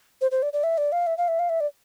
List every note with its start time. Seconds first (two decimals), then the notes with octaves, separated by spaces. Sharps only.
0.21 C5
0.31 C5
0.43 D5
0.53 D5
0.64 E5
0.78 D5
0.92 F5
1.07 E5
1.18 F5
1.28 E5
1.39 F5
1.49 E5
1.60 D5